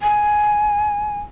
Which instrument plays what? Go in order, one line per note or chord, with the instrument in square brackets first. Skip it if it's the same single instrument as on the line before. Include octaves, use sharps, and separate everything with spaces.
[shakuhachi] G#5